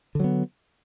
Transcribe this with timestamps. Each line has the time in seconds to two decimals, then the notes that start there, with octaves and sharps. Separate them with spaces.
0.15 D3
0.20 F#3
0.24 B3